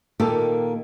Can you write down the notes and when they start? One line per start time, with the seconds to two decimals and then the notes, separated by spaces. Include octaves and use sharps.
0.20 A#2 D#3 A#3 D#4 G4 A4